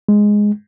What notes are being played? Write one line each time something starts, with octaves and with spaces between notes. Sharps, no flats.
G#3